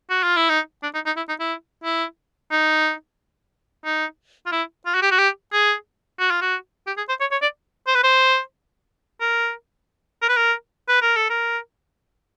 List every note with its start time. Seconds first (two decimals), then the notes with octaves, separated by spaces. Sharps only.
0.10 F#4
0.23 F4
0.37 E4
0.49 D#4
0.83 D4
0.95 D#4
1.06 D#4
1.17 E4
1.29 D#4
1.40 E4
1.84 E4
2.52 D#4
3.85 D#4
4.46 F4
4.52 E4
4.86 F4
4.94 F#4
5.02 G4
5.11 F#4
5.18 G4
5.53 G#4
6.20 F#4
6.31 F4
6.42 F#4
6.87 G4
6.97 G#4
7.09 C5
7.21 C#5
7.32 C#5
7.42 D5
7.87 C5
7.95 B4
8.04 C5
9.21 A#4
10.22 A#4
10.29 B4
10.37 A#4
10.89 B4
11.02 A#4
11.16 A4
11.30 A#4